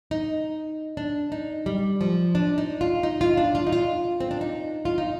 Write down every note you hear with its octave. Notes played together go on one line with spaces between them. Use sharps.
D#4
D4
D#4
G3
F3
D4
D#4
F4
D#4
F4
D4
F4
D#4
F4
C4
D4
D#4
F4
D#4